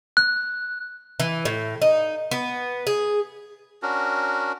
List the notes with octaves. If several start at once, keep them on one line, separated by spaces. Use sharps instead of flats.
F#6
E3
A2
D#4
B3
G#4
C#4 D4 F#4 A#4